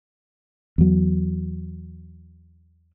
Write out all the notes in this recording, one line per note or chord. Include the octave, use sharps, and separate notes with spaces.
E2 F#3